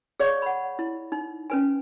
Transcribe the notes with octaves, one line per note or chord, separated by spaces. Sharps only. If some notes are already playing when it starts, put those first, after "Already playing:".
G#4 C#5 D5 F5 C#6
F#5 B5
E4
D#4
C#4 B4 G#5